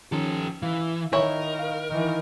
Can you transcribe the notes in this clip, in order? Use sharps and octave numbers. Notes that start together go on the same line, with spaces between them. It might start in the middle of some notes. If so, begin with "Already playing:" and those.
D#3 F3 C#4 G4 A4
E3 F5
D#3 E4 A#4 C#5
F5
D#3 E3